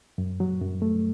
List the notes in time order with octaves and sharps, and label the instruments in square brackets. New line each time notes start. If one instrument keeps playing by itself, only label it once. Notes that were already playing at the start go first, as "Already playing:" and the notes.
[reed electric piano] F#2
F#3
F#2
A3